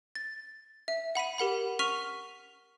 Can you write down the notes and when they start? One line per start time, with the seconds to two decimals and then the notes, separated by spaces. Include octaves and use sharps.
0.15 A6
0.88 E5
1.15 F#5 B5 B6 D#7
1.38 G4 A#4 F#5 B5
1.79 C#6 F6 B6 D#7 F7 G7